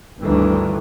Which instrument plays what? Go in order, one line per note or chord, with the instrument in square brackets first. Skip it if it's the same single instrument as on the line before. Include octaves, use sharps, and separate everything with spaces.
[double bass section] G1 D2 G2 D#3 E3